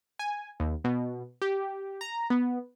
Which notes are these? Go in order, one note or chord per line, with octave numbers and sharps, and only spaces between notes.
G#5
D#2
B2
G4
A#5
B3